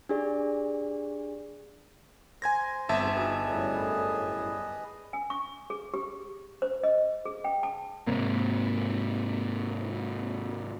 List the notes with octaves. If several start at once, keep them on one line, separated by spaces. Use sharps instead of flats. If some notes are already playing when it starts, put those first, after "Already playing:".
D4 G4 G#4 D5
C5 G#5 G#6 A#6
G1 E2 D3 C4 E5 A5
D#4 E4 F#4 G#4 B4 D#5
F#2 A2 G3
G#5
C#6
G#4
G4
C5
D#5
G#4
G5
A5
G#2 C3 A#3